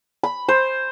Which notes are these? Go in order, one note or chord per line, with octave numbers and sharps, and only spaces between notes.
B5
C5